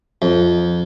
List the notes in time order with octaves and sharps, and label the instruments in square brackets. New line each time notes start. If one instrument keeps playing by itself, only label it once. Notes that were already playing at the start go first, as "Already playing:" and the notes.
[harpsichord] F2